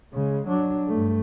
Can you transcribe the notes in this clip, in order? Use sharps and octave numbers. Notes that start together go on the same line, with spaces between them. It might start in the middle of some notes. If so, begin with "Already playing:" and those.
C#3 G#3
F#3 D4
G2 A3